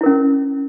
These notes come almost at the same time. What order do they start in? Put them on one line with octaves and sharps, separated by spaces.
E4 A#4 C#4